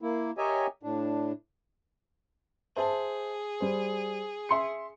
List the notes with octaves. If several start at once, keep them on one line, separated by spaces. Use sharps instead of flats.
A#3 E4
G4 A#4 C#5 D#5 E5 G#5
A2 D4
G#4 C5 E5 A5
G3 C5
E5 C6 C#7